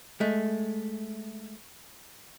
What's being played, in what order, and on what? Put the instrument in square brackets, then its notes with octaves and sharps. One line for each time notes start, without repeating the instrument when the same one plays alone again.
[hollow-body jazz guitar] G#3 A3